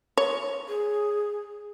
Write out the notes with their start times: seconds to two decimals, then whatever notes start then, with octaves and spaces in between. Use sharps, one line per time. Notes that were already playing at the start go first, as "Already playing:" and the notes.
0.17 C#5
0.69 G#4